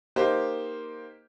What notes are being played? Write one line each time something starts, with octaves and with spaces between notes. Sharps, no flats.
A#3 D#4 G4 C5